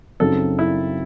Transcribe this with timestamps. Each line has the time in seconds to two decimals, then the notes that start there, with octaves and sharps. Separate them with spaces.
0.20 F#2 C#3 F#3 C4 D#4 A4
0.59 E4